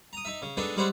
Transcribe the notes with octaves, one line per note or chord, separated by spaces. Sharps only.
A#5 D#6
D#4 E5
C#3
G#3 B3 D4 D#4 A4
G3 G#3 C#4 E4 C5 F#5